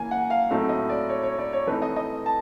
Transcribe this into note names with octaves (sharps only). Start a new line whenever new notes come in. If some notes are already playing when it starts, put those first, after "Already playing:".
Already playing: C#3 E3 A#3 C#4 G#5
F#5
F5
A2 F#3 A3 C4 D#4
D#5
D5
C#5
C#5
D5
C#5
E3 A3 C4 D#4 B4
D#5
D#5
A5